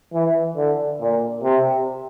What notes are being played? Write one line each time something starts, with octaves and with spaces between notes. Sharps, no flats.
E3
D3
A#2
C3